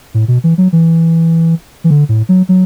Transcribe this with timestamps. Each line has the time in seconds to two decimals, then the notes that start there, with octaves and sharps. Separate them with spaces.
0.14 A2
0.28 B2
0.44 E3
0.58 F#3
0.73 E3
1.84 E3
1.90 D3
2.09 A2
2.29 F#3
2.49 F#3